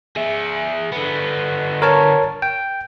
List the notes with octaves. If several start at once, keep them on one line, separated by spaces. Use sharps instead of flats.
G#4 E5
D3 B3
A#4 C#5 A5
G5